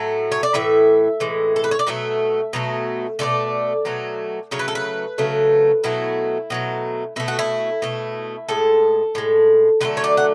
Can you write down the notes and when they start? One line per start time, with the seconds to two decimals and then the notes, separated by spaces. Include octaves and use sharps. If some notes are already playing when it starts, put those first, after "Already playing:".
Already playing: A2 F#3 A3 E5
0.32 C#5
0.43 D5
0.54 A2 E3 E5
1.20 A2 E3 G#3
1.56 A4
1.64 B4
1.71 C#5
1.79 D5
1.87 B2 F#3 A3 E5
2.53 B2 F#3 A3
3.19 B2 F#3 A3 D5
3.85 B2 F#3 A3
4.51 C#3 F#3 A3 C#5
4.59 B4
4.68 A4
4.75 B4
5.18 C#3 F#3 A3
5.84 B2 F#3 A3 E4
6.50 B2 F#3 A3
7.16 B2 A3 E4
7.28 F#4
7.39 E4
7.82 B2 A3
8.49 A2 G#3 A4
9.15 A2 G#3
9.81 D3 F#3 A3 B4
9.97 C#5
10.04 D5
10.17 F#5